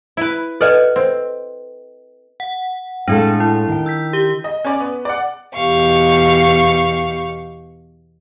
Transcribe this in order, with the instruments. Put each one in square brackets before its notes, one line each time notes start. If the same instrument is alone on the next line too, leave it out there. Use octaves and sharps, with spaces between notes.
[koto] E4 B4
[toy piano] A4 B4 D#5 [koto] D5 F#5 G#5
[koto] C4
[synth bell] F#5
[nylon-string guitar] A2 G#3 A4 [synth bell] C4 D4
[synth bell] E4
[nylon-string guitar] D#3 G5
[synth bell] E6 G6 B6
G4 G7
[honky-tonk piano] D#5
C#4 D5
B3
D5 F#5
[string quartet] E2 B2 G4 F5 C#6